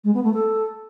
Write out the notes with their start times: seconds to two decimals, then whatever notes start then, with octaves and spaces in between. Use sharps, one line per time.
0.03 G#3
0.13 B3
0.23 A3
0.33 A4